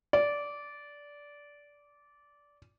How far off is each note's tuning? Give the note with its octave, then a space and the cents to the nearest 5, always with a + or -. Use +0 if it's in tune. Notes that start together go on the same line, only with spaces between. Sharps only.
D5 -15